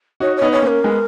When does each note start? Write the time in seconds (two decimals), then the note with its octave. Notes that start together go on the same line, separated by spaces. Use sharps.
0.20 D#4 F#4 C#5
0.36 C#5
0.42 B3 D#4
0.52 C#5
0.62 A#3 C#4
0.69 A#4
0.84 G#3 B3